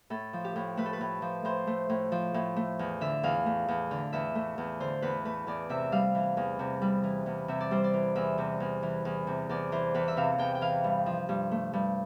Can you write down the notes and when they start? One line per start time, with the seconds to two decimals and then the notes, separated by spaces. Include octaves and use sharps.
0.10 A2 A4
0.33 F3
0.44 G4
0.56 A2
0.77 A3 B4
0.86 A4
0.93 B4
1.01 A2
1.22 F3
1.45 A2 C5
1.67 A3
1.89 A2
2.12 F3
2.34 A2
2.56 A3
2.79 E2
3.01 D3 E5
3.23 E2 F5
3.46 A3
3.68 E2
3.91 D3
4.13 E2 E5
4.35 A3
4.58 E2
4.80 D3 C5
5.02 E2 B4
5.25 A3 B4
5.47 E2 D5
5.69 C3 E5
5.92 G3 F5
6.15 E3
6.37 E2
6.59 C3
6.82 G3
7.03 E3
7.26 E2
7.48 C3 E5
7.60 D5
7.71 G3 C5
7.84 D5
7.93 E3
8.15 E2 E5
8.38 C3
8.60 E2
8.83 E3
9.05 E2
9.27 C3
9.49 E2 D5
9.72 E3 C5
9.94 E2 B4
10.08 E5
10.17 C3 F5
10.38 E2 G5
10.55 G5
10.61 E3 F5
10.84 G2
11.06 F3
11.29 G2
11.51 A3
11.73 G2